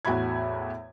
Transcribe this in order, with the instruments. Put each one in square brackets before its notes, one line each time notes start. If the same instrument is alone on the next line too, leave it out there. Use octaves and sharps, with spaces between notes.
[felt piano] E2 A2 F#4 E5 B5 G#6